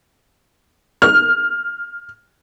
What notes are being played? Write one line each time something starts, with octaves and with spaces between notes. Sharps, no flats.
F6